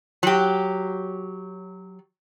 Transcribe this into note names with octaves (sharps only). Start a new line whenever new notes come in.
F#3 G4